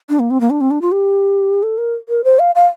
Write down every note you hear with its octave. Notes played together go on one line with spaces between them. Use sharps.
D4
A#3
C4
A#3
D4
C4
D4
F4
G4
A4
A#4
A#4
C5
F5
F5